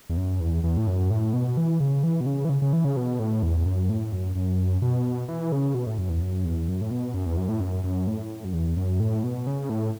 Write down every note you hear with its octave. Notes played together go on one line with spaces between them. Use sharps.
E2
F#2
E2
E2
A2
F#2
A2
B2
E3
C#3
E3
B2
C#3
E3
C#3
C#3
E3
C#3
B2
A2
E2
F#2
A2
F#2
F#2
B2
E3
C#3
B2
A2
F#2
E2
F#2
E2
F#2
A2
B2
F#2
E2
F#2
A2
F#2
F#2
A2
F#2
E2
F#2
A2
B2
C#3
A2